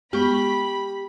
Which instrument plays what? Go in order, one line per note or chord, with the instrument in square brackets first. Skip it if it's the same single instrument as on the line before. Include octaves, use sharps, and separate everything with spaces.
[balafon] G#3 B3 C#6 [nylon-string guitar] G4 [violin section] B5